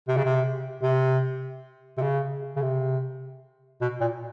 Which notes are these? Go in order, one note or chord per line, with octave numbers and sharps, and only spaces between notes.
C3
C#3
C3
C3
C3
C#3
C#3
C3
B2
A#2